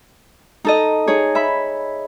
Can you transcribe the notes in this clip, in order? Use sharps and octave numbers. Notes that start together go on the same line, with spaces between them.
D#4 A4 D#5
D#4 G#4 C#5
E5 B5